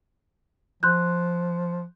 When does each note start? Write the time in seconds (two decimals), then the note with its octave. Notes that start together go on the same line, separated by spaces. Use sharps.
0.83 F3 C6 F#6 G6